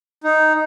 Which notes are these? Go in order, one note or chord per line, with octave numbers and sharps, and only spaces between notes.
D#4